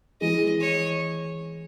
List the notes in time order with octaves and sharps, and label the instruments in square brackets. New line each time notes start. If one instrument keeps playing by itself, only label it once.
[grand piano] E3 G#3 [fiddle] D#5
[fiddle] C#5